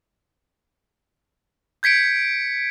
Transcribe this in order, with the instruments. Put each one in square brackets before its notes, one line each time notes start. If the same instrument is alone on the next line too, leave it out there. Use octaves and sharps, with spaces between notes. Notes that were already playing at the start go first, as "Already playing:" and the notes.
[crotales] G6 G#6 B6 C#7 D7